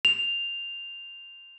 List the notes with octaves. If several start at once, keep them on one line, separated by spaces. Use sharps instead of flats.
F7